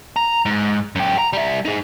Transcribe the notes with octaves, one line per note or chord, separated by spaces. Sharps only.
A#5
G#2
F#2 G4
A#5
G3 E5
D#4 G#4